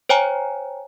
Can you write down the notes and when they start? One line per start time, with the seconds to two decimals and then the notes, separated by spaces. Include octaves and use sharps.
0.09 C5 C#5 G5 G#5 A#5